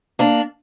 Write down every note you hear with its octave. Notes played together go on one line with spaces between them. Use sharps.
A#3 D4